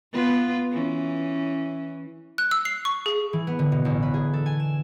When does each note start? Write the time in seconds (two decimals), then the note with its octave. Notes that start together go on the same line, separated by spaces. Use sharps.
0.12 B3 F4 B4
0.71 E3 C#4
2.38 F#6
2.51 E6
2.65 C7
2.85 C#6
3.06 G#4
3.33 E3
3.47 B3
3.59 D3
3.72 B2
3.85 A1
4.02 B4
4.14 G#4
4.34 A4
4.46 G#5
4.60 E7